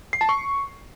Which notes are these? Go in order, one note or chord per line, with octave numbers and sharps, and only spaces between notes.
C7
A5
C#6